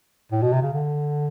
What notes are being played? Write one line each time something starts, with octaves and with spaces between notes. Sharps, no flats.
A2
B2
C3
C#3
D3